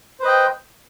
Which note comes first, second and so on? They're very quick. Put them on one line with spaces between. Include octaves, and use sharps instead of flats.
C5 B4 D#5 G5